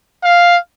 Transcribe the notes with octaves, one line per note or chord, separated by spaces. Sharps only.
F5